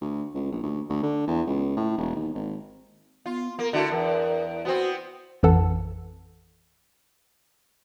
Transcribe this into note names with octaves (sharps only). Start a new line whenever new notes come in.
D2
C#2
A#1
D2
D2
D3
E2
C#2
A2
E1
D#2
G#1
B3 F4
A#3 A#4
D3 A3 E4 F#4
E2 A#4
B3 C4 F#4
A1 F2 E3 A4 F#5 A5